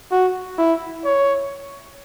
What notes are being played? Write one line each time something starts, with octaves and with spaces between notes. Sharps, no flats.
F#4
E4
C#5